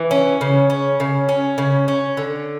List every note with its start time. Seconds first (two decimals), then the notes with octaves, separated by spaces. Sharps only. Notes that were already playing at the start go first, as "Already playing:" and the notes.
Already playing: E3
0.11 C#4
0.41 C#3
0.70 C#4
1.00 C#3
1.29 C#4
1.58 C#3
1.88 C#4
2.17 D3